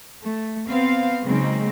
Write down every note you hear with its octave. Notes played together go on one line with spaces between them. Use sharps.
A3
B3 C4 F5
C#3 F#3 G#3 A#3 C4 D#4